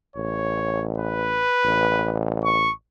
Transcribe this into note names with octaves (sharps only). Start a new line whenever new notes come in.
A1 C#5
B4
A1
C#6